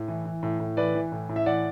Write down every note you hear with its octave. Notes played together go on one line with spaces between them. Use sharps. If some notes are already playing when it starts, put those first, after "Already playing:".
Already playing: A2
E3
E3
A2
A2
E3 B4 D5
E3
A2
A2
E5
E3 D5 F#5